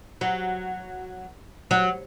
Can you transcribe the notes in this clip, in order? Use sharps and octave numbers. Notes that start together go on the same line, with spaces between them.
F#3
F#3